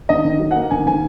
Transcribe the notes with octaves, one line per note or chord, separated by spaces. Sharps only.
D#3 D#5
D#3
F#3
A#3 F#5
D#3 G#5
D#3 G#5